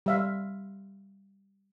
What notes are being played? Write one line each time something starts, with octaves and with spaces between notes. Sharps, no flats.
G3 E5 F5